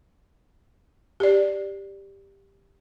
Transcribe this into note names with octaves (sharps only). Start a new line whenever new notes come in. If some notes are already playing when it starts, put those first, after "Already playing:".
G4 D5